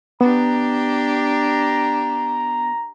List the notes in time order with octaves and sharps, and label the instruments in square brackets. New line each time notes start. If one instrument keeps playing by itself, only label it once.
[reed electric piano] B3 [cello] D4 G4 [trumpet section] A#5